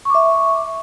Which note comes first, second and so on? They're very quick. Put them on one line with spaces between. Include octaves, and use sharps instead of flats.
C#6 D6 E5